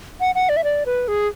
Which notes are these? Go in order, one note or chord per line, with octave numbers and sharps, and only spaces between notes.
F#5
F#5
D5
E5
D5
B4
G#4